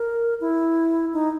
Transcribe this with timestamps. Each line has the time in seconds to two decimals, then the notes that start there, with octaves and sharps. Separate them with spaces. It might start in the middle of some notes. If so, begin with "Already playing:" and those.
Already playing: A#4
0.41 E4
1.13 D#4